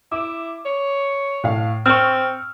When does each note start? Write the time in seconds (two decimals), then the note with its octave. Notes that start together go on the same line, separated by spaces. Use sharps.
0.12 E4 D6
0.65 C#5
1.44 A2 F5
1.86 C4 C#6 E6 F6